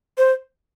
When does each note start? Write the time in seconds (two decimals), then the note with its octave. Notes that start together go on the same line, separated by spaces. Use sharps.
0.18 C5